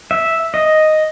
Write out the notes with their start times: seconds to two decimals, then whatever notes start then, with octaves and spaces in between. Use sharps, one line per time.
0.11 E5
0.54 D#5